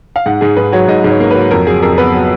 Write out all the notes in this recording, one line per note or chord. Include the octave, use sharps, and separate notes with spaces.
F5
G#2 F#5
G#2 G#4
G#2 B4
F#3 C#5
G#2 D#5
G#2
C#5
A#3
F#3 B4
F2 A#4
F#3 G#4
F2 A#4
B3 B4
F#3